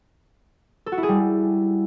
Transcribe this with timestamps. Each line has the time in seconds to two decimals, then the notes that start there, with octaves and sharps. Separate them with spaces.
0.86 A4
0.92 F#4
0.98 E4
1.03 G#4
1.09 G3